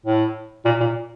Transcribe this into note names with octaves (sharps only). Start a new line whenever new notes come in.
A2
A#2
A#2